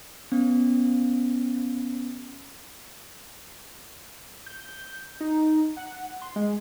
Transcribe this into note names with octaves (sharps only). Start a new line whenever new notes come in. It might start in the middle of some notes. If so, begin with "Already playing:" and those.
B3 C#4
G6
D#4
F#5
C6
G#3